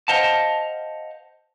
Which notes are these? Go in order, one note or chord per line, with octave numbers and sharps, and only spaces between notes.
C5 D#5 F5 F#5 A5